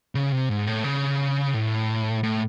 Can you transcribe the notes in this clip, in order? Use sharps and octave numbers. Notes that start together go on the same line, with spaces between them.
C#3
C3
G#2
A2
C#3
A2
A2